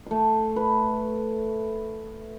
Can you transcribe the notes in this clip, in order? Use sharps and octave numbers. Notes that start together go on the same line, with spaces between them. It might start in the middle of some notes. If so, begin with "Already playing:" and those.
A3 C6
B4